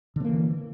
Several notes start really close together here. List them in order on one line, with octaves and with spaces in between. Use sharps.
D3 C4 A#3 E3